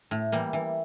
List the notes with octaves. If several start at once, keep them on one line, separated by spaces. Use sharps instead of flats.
A2
E3 G3 A#3
E3